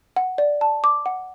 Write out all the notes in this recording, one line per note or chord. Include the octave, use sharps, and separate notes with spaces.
F#5
D5
A5
D6
F#5